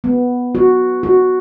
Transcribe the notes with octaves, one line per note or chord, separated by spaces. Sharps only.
B3
F#4
F#4